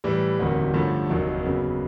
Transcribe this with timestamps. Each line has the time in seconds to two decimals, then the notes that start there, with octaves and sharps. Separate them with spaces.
0.04 A2 E3 G3
0.39 E1 D2 C3 D#3 F#3
0.74 G2 D3 F3 A3 C#4
1.09 F1 D#2 D#3 F#3 A#3
1.43 F#2 C#3 F#3 B3